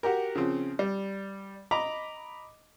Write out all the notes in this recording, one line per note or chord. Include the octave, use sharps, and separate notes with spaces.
F#4 G4 A#4
C#3 F3 C4
G3
D#5 A#5 B5 D6